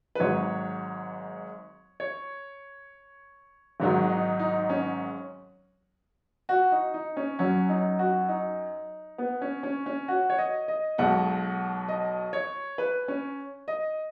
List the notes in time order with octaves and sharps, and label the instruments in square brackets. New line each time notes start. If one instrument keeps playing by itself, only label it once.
[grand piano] B4
G#1 G#2 F#3 C#5
C#5
G#1 G#2 D#3 F#3
D#4
D#4
C#4
F#4
D#4
D#4
C#4
F#2 F#3 C#4
D#4
F#4
D#4
B3
C#4
C#4
C#4
F#4
C#5
D#5
D#5
B1 B2 G#3 F#5
D#5
C#5
B4
C#4
D#5